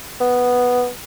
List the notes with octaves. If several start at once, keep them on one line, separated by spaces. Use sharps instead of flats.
B3